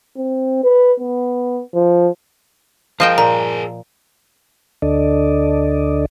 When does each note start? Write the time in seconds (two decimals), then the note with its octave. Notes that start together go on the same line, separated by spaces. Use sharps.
0.17 C4
0.64 B4
1.00 B3
1.74 F3
3.00 F3 G#4 A#4 D#5 F5 G5 E7
3.18 A#2 A#5
4.82 D2 D3 D4 A4 D5 D#5